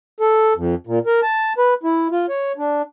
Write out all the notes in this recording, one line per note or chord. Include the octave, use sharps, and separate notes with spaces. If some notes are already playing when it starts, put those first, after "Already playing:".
A4
F2
A#2
A#4
A5
B4
E4
F4
C#5
D4